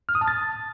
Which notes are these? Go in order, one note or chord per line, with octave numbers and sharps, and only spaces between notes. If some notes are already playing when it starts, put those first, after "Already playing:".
F6
D#6
A5
A6